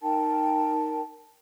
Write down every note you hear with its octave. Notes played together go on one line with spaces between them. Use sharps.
D#4 A#4 G5 A5